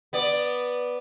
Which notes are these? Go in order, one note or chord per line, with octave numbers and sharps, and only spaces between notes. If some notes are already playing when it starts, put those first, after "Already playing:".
B3 D5